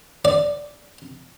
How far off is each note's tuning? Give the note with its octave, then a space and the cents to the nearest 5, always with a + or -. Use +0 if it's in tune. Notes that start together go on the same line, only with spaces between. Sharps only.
D5 -5